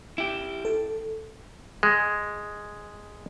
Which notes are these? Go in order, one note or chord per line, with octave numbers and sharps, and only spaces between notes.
E4 G4
A4
G#3